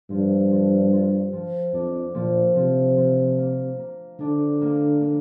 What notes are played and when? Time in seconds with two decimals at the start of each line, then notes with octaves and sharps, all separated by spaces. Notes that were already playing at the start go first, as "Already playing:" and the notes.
0.10 G2 F3
0.51 F3
0.92 F4
1.33 F3
1.73 F2 D4
2.15 A#2 F3
2.56 C3 F3
2.96 F3
3.38 A#3
3.79 A#3
4.20 D3 D4
4.61 A#3
5.02 A#3